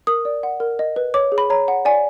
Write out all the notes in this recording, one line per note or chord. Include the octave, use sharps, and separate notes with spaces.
A#4 D#6
D5
F#5
A#4
D#5
B4
C#5 D6
G#4
B5
C#5 A#5
F#5
D5 G#5